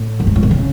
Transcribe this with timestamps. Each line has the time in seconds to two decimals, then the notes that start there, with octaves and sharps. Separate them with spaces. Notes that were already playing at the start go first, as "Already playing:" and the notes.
Already playing: A2
0.20 F#2
0.27 G#2
0.36 A2
0.43 B2
0.51 C#3